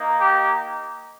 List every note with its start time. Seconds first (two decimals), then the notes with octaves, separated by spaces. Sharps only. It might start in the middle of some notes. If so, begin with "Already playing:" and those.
Already playing: A#3 D#4
0.20 G4